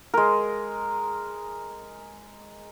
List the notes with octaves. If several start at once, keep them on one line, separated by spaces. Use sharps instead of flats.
G#3 A#4